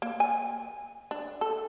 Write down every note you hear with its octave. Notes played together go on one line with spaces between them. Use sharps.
A#3
G#5
D4
A4